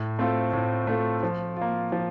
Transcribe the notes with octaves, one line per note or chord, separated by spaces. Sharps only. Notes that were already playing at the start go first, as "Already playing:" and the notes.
Already playing: A2
A3 C4 F4 A4
A2
A3 C4 F4 A4
F3
A#3 F4
F3